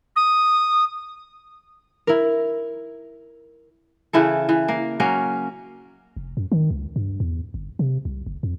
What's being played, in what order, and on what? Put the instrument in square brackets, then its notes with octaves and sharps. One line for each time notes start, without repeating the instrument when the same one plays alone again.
[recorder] D#6
[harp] E4 A#4
[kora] C#3 E3 E4 A4
E3
A#3
F#3 A#3 C#4
[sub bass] F1
F#2
D#3
C#2
G2
E2
G1
C3
C2
F#1
F2